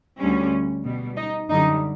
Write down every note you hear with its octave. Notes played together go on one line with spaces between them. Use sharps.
D2 D3 G3 C#4
B2 G3
D#4
F#2 D3 G3 D#4